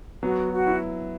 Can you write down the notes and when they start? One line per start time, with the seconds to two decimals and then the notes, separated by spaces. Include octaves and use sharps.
0.23 F#3 B3 F#4
0.52 F#4
0.67 E4